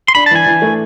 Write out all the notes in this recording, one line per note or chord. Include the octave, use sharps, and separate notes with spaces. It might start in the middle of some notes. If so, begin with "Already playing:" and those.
C6
D4 B5
A5
E3 G#5
E3
A3